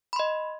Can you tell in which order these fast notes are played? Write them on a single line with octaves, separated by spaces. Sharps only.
B5 C6 D#5